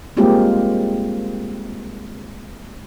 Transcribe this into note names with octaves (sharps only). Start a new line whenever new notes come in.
G3 G#3 A#3 C4 F4 G4